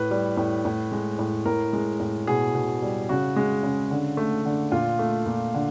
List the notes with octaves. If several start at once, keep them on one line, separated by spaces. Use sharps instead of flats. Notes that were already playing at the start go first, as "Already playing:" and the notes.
Already playing: A2 B4
G3
A2
A2
G#3
A2
A2 A#4
G#3
A2
B2 G#4
B2
G3
C#3 F#4
G#3
C#3
D3
A3
D3
A#2 F4
A3
A#2
D3